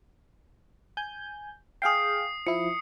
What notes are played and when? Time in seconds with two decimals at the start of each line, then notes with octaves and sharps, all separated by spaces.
0.97 G#5 G6
1.82 G#4 F5 G5 D#6 C7
2.47 F3 E4 C#7